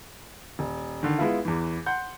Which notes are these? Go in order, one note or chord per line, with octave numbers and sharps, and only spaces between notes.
D#1
D3 D#3
G#3 B3 E4 F4
E2 E3
F#5 C6 G6